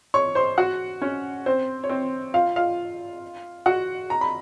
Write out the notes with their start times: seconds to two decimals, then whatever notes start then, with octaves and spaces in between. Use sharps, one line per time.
0.14 C#5 C#6
0.35 C5 C6
0.58 F#4 F#5
1.02 C#4 C#5
1.46 C4 C5
1.84 C#5
1.89 C4 C5
2.34 F4 F5
2.56 F4 F5
3.66 F#4 F#5
4.10 A#5
4.21 B5